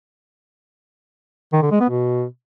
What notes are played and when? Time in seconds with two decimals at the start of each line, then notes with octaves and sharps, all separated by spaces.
1.53 D#3
1.62 D3
1.71 G#3
1.80 B3
1.90 B2